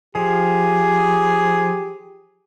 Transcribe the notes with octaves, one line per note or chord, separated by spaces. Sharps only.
F3 G4 G#4